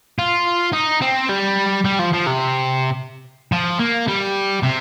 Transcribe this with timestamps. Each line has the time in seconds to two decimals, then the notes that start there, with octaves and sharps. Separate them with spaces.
0.19 F4
0.73 D#4
1.01 C4
1.29 G3
1.85 G3
1.99 F3
2.13 F3
2.26 C3
3.52 F3
3.80 A#3
4.08 G3
4.63 C3